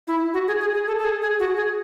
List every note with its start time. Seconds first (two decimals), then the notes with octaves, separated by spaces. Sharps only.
0.08 E4
0.34 F#4
0.48 G#4
0.60 G#4
0.74 G#4
0.87 A4
0.99 A4
1.04 G#4
1.22 G#4
1.39 F#4
1.57 G#4